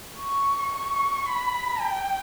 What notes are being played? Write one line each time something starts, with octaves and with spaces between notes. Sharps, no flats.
C#6
C#6
B5
G5